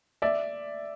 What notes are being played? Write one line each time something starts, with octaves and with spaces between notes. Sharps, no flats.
D5 E5